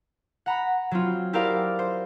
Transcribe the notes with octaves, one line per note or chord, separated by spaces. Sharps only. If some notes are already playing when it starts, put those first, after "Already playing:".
F#5 A#5 B5
F#3 C4 F4
E4 G4 A#4 C5 D5 F5
C5